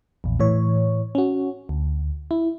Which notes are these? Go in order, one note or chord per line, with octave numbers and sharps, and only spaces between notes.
A#1 E2
A2 E3 C#5
C#4 F#4
D2
E4